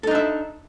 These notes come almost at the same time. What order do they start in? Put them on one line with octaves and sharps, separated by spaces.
A4 D#4 D4 E5